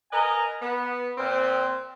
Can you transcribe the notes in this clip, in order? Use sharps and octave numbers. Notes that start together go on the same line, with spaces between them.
A#4 B4 D#5 G#5 A#5
B3
A#2 C4